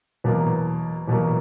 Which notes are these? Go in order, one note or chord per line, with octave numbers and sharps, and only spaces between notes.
E2 B2 F#3 A#3
E2 B2 F#3 A#3